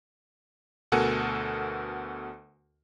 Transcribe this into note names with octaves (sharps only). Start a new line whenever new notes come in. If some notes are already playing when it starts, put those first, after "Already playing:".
D2 B2 A4 A#4 F#5 G#5